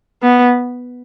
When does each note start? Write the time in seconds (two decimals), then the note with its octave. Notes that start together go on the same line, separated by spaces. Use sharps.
0.23 B3